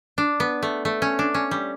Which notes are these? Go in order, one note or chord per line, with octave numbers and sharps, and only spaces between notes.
D4
B3
A3
A3
C#4
D4
C#4
G3